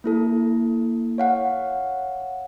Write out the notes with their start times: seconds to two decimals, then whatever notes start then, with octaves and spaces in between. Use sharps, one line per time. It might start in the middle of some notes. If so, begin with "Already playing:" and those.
0.04 A#3 E4 A4
1.18 C#5 F5 F#5